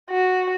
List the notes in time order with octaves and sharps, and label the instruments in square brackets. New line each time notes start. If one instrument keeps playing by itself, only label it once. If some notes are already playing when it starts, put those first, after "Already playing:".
[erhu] F#4